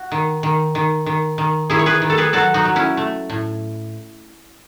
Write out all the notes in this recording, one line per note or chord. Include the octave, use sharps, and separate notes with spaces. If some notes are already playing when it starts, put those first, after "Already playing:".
Already playing: F#4
D#3
D#3
D#3
D#3
D#3
D#3 E4 G#4
C#5
G#4 B4
D#3
A4
G#4 B4
F#3 F#4 A4
D#4 F#4
F#3
C#4 E4
A3
A2